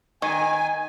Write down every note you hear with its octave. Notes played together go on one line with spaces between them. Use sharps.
D#3 G#5